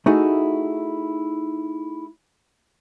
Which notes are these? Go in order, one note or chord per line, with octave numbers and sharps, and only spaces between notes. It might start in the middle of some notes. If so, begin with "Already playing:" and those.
A3 D#4 E4 F#4 G#4